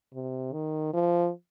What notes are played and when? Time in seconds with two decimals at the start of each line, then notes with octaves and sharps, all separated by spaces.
0.14 C3
0.53 D#3
0.94 F3